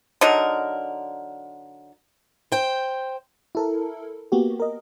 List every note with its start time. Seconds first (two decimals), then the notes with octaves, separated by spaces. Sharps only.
0.21 D3 F#3 D#4 A#4
2.52 C5 G5
3.55 E4 A4 A#4
4.32 A#3 B3 F#4 G4
4.60 A#4 D#5